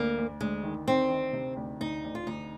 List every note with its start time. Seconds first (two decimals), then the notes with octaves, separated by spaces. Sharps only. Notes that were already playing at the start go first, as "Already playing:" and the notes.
Already playing: D2 A#3
0.17 D2
0.41 D2 G#3
0.63 D#3
0.87 D#3 C4
1.10 D#3
1.33 C3
1.57 D2
1.80 D2 D#4
2.04 D2
2.15 F4
2.27 D2 D#4